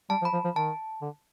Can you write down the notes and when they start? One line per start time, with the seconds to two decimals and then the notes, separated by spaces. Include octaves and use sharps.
0.10 G3 A5
0.22 F3
0.25 B5
0.33 F3
0.45 F3
0.56 D#3 A5
1.02 D3